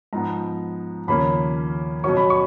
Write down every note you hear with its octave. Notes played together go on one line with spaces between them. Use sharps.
G#2 F3 B3 A#5
D#2 C#3 F3 A#3 C#4 B5
B2 F#3 C#4 C#6
B5
C#6